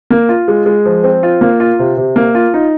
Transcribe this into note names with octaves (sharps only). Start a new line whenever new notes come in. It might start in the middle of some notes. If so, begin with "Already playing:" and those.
A#3
F4
G#3
G#3
F3
C4
F4
A#3
F4
C3
C3
A#3
F4
D#4